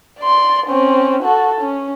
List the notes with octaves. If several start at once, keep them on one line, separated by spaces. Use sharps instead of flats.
D5 C6
C4 C#4
F#4 A4
C#4